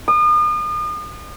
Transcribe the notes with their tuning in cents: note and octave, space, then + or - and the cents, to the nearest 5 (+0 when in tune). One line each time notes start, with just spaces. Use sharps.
D#6 -40